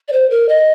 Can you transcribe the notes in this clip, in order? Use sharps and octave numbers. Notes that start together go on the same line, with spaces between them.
D5
C5
A#4
D#5